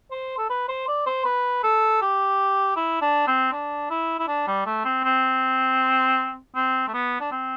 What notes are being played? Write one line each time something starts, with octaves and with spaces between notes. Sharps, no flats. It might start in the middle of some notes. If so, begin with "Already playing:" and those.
C5
A4
B4
C5
D5
C5
B4
A4
G4
E4
D4
C4
D4
E4
E4
D4
G3
A3
C4
C4
C4
A3
B3
D4
C4